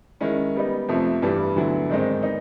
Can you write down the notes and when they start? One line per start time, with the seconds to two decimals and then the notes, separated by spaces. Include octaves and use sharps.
0.20 D#3 G#3 C#4 E4
0.55 G3 B3 D#4
0.88 F2 C3 F3 A3
1.22 G2 E3 G3
1.56 D2 D3 F#3 B3 E4
1.89 G#2 D#3 G#3 C4 D#4
2.23 B3 D#4